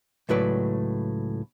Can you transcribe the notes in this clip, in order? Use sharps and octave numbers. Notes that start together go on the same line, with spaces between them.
C#2 A2 F#3 B4 D5